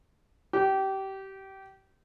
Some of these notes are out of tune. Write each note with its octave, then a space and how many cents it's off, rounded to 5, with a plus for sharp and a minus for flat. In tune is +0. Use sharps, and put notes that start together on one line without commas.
G4 -25